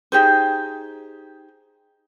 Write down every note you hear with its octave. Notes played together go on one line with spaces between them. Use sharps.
D#4 G4 G#4 C5